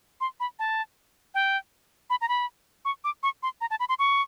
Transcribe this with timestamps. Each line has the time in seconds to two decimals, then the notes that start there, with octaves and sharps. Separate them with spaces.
0.21 C6
0.40 B5
0.59 A5
1.34 G5
2.10 B5
2.21 A#5
2.29 B5
2.85 C#6
3.04 D6
3.23 C#6
3.43 C6
3.61 A#5
3.71 A5
3.80 B5
3.89 C6
3.99 C#6